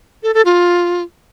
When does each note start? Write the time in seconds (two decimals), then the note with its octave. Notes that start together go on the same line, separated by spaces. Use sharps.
0.23 A4
0.34 A4
0.45 F4